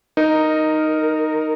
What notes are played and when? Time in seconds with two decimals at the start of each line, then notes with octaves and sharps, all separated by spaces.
0.17 D#4 A#4